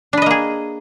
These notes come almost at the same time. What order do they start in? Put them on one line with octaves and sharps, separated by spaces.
D4 B4 D#5 A#3 G#4